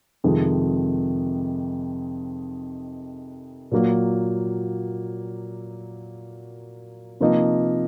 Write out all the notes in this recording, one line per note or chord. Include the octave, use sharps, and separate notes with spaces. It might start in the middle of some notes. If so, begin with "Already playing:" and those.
F2 C3 D#3 G#3
A#2 F#3 A#3
C3 F3 A#3 D#4